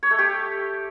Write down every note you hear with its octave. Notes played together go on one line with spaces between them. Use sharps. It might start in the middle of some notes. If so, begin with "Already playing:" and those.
C#5
A3
G4